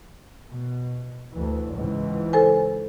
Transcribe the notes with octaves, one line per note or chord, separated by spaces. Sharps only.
B2
D2 E3
C#2 G#2 E3
A4 C5 G#5